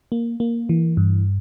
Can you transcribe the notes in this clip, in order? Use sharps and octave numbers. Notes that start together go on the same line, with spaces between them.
A#3
A#3
E3
G2